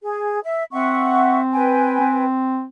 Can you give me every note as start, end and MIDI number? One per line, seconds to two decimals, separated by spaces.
0.02 0.39 68
0.44 0.63 76
0.72 1.97 60
0.72 1.40 76
0.72 1.40 78
0.72 1.40 85
1.52 2.25 71
1.52 2.25 79
1.52 2.25 80
2.00 2.64 60